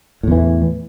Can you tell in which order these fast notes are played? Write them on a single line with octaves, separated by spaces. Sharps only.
A2 E2 E3